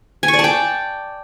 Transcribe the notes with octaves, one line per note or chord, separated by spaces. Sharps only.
G#5
C#6
D5
A5
G5